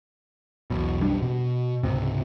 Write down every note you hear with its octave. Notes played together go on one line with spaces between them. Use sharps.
E1 B1 B2
B1 F2 G3 D4
B2
C#2 G#2 C3